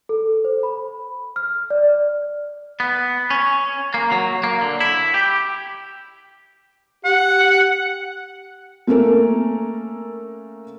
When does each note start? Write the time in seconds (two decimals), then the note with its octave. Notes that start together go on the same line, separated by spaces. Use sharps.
0.09 A4
0.45 C5
0.63 B5
1.36 F6
1.70 D5
2.80 B3
3.30 C#4
3.94 A#3
4.12 F#3
4.44 A#3
4.61 D3
4.81 E4
5.14 G4
7.05 G4 F#5
8.87 A3 A#3 C#4 A4 A#4